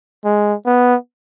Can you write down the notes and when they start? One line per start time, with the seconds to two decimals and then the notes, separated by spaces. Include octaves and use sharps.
0.25 G#3
0.66 B3